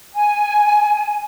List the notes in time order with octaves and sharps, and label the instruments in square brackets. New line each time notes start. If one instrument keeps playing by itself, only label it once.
[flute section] G#5